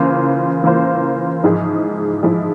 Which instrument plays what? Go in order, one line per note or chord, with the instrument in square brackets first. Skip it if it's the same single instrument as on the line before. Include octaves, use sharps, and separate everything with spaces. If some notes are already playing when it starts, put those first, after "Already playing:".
Already playing: [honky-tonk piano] C#3 E3 A#3 F4 C5
C#3 E3 A#3 F4 C5
G#2 F3 G#3 E4 G#4
G#2 F3 G#3 E4 G#4